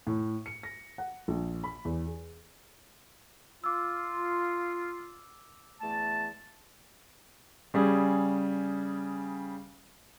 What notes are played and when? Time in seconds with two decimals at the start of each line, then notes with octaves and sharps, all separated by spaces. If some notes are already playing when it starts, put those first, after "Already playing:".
0.07 A2
0.46 C#7
0.63 A#6
0.98 F#5
1.28 A#1
1.64 B5
1.85 E2
2.06 G#4
3.64 F4 D6 E6
5.81 E2 A3 A5
7.74 C#3 G3 G#4